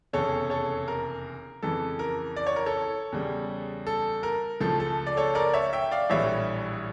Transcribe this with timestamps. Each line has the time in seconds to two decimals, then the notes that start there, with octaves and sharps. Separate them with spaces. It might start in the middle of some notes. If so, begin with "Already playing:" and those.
0.13 F1 E2 C#3 A4 C#5
0.50 A4 C#5
0.88 A#4
1.63 F2 C#3 E3 A4
1.99 A#4
2.36 D5
2.47 C#5
2.56 A#4
2.66 A4 C#5
3.12 E2 C#3 G3
3.87 A4
4.23 A#4
4.60 C#2 C#3 F3 A3 A4
4.80 A4
5.07 D5
5.17 A4 C#5
5.35 A#4 D5
5.54 C#5 E5
5.73 E5 G5
5.91 D5 F5
6.10 A#1 A2 E3 G3 C#5 E5